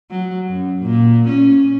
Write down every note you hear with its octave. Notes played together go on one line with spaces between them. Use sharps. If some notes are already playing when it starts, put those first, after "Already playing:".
F#3
F#2
A#2
C#4